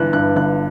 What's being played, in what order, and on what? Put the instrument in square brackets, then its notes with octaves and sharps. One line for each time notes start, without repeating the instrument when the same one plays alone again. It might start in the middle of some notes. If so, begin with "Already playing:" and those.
Already playing: [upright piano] G1 G2 E3 F#6
G2 F#6
G1 F#6